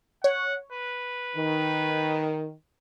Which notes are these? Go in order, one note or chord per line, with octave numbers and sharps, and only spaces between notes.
C#5 F#5
B4
D#3